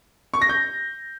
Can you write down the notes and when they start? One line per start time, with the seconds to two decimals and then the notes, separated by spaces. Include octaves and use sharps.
0.34 C#6
0.41 A#6
0.49 G6